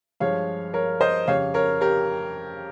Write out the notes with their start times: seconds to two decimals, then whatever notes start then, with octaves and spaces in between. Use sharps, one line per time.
0.20 G2 F3 G#3 C#5 F5
0.74 A#4 C#5
1.01 C5 D#5
1.28 F2 C#3 G3 C#5 F5
1.54 A#4 C#5
1.81 G4 A#4